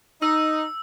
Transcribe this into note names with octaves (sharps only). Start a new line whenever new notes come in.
D#4 E6